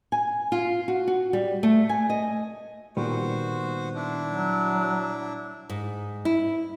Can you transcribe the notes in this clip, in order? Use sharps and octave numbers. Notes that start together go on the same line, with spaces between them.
G#5
F4
F#4
F#4
G3
A3
G#5
D#5
A#2 D#3 G3 B3 F#4 C5
D4 E4
F#3
G#2
E4